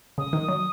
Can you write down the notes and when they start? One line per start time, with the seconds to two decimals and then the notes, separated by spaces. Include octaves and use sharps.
0.18 C#3 D#6
0.33 D#3
0.48 F#3